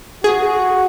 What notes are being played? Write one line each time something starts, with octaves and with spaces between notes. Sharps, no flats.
F#4 G#4